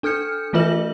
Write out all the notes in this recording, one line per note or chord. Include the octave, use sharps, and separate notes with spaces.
D4 A4 F6 G6 C#7
E3 A3 F4 B4 E5 F#7